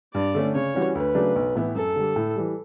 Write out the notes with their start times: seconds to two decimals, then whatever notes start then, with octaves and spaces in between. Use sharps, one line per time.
0.14 G2 D5
0.35 D3 A3 C#4
0.55 C#3 C#5
0.75 E3 G3 C#4 F#4
0.95 D2 B4
1.15 C#3 F#3 A3 D4
1.36 B1
1.55 A2 E3 B3 E4
1.75 F#2 A4
1.96 D3 G3
2.16 A2
2.36 E3 G3